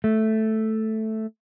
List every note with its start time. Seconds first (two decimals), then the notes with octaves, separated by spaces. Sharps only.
0.04 A3